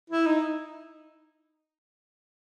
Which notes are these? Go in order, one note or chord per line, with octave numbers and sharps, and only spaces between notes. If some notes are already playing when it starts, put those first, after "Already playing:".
E4
D#4